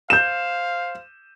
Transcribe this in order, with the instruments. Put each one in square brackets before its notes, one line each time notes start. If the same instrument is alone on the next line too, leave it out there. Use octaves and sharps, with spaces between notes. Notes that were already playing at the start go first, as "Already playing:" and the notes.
[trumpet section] C5 F5 [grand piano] G6 E7